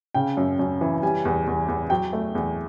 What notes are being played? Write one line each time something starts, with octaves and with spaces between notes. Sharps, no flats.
C#3 G5
F#2
F#2
E3
G3 G#5
E2
E2
E2
F#3 G5
A3
E2